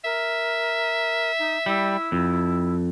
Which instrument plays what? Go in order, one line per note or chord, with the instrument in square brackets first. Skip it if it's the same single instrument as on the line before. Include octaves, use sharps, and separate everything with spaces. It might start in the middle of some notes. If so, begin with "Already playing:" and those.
[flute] A#4 [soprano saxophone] E5
[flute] D#4
[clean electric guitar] G3 [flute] E4
[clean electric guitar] F2